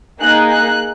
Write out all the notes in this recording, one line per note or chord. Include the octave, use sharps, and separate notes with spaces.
A#3 D#4 G#4 F#6
F#6